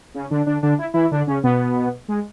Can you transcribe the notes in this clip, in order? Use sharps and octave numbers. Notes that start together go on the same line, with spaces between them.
C#3 C#4
D3 D4
D3 D4
D3 D4
E4
E3 E4
D3 D4
C#3 C#4
B2 B3
G#3